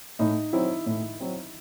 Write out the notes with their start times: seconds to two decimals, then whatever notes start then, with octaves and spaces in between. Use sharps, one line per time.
0.19 A2 D#4
0.53 F#3 C4 E4
0.86 A2
1.20 F#3 C4